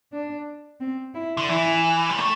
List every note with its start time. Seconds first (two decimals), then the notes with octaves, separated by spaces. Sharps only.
0.12 D4
0.80 C4
1.15 E4
1.37 D3
1.49 E3 E4
2.10 G3
2.18 A3